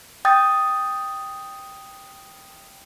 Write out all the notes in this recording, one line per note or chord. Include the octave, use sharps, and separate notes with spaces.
G5 D#6 G6 A6